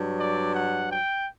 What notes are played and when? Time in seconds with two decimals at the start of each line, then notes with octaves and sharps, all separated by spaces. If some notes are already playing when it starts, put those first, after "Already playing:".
Already playing: G2 F#3
0.17 D5
0.53 F#5
0.89 G5